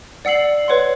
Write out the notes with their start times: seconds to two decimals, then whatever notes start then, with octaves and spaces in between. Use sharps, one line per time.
0.25 D5 F#5 E6 C7 F#7
0.68 B4 C#5 F#5 C6